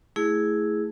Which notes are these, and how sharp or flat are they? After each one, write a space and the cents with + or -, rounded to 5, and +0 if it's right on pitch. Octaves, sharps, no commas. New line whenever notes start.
A3 +0 E4 -10 G#4 +0